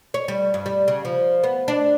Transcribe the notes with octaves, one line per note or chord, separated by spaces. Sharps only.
C#5
G3
G2
G3
C#3
F3
B3
D4